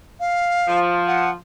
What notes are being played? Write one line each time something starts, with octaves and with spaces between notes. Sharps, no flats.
F5
F3
F#5